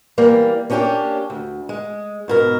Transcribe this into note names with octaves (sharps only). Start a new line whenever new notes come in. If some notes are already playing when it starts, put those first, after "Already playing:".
E3 G3 A#3
A#3 C#4 D4 G4 C#5
D2
G#3
G#2 B2 A#4